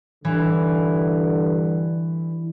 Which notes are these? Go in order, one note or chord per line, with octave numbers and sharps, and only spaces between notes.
G2 D3 E3